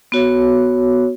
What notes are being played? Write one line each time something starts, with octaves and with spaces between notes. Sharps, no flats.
B3 F#4 C#5